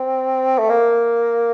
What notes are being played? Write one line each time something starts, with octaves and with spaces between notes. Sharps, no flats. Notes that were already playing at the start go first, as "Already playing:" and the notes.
Already playing: C4
A3
A#3